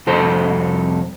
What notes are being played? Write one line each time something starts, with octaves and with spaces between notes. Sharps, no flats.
C2 F2 F#4 A4 C5